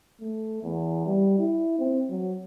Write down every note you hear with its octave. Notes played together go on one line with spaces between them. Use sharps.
A3
E2
G3
E4
C4
F#3